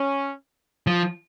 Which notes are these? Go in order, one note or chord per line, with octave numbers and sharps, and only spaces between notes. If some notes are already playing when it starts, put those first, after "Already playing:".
Already playing: C#4
F3